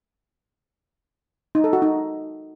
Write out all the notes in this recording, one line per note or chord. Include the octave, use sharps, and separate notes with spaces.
D#4
A4
F#4
D#4